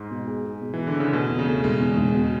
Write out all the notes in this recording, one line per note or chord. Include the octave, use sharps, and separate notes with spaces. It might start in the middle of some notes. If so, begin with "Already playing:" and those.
Already playing: G#2
B2
G#4
G#4
B2
E3
G#4
D3
C#3 C#4
B2 A3
E2
C#3
A3
E1 G#3
E2
E1
B2